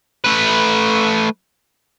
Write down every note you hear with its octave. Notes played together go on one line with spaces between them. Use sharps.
A3 B4